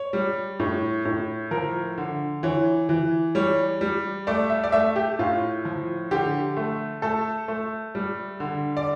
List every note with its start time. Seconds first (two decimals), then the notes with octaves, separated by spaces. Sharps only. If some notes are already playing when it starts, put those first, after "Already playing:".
Already playing: C#5
0.13 G3
0.60 A2
1.05 A2
1.51 F3 A#4
1.98 D3
2.43 E3 C#5
2.89 E3
3.35 G3 C#5
3.81 G3
4.27 A3 D5
4.50 E5
4.64 D5
4.72 A3 E5
4.96 G4
5.19 A2 F4
5.65 F3
6.11 D3 G4
6.57 A3
7.02 A3 A4
7.48 A3
7.95 G3
8.40 D3
8.77 D5